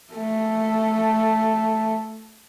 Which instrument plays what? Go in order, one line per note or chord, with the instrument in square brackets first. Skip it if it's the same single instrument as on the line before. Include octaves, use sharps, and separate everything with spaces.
[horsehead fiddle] A3 A4